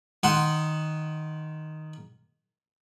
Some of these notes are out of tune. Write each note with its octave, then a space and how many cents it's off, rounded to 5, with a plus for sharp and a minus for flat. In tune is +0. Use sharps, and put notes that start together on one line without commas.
D#3 +0 F#5 +0 C6 +0